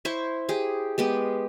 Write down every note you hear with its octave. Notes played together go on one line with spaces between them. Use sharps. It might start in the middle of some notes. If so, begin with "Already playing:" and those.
E4 C5 C#6
G4 G#4
G#3 B3 G4